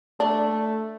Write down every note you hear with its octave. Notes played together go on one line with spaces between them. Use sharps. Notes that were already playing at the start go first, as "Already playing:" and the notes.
A3 D4